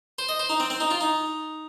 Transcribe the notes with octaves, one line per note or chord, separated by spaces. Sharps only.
C5
D#5
C5
D#4
C4
C4
D#4
F4
D#4